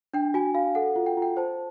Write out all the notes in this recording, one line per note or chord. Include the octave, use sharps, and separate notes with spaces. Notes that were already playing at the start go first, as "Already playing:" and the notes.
D4 G5
F#4 G#5
F#4 F5
A4 F#5
F4
G5
F4 G5
C5 A5